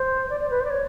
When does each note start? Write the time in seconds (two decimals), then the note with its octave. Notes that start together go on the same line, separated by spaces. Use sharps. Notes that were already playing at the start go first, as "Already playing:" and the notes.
Already playing: C5
0.30 D5
0.40 D5
0.50 B4
0.60 C5
0.65 D5
0.70 C#5